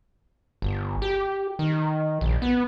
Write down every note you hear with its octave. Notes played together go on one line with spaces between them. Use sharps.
G1
G4
D#3
A#1
B3